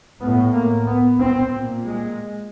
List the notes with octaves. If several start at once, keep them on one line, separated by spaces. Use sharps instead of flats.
A2 B3
A#3
B3
C4
A#2
G#3